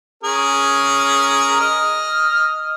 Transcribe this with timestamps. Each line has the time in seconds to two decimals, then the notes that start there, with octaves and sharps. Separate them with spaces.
0.24 C#4 G#4 A#4
1.61 D#5 F6